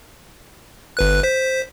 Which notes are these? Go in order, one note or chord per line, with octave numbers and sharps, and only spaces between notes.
G1 B4 F#6
C5 B6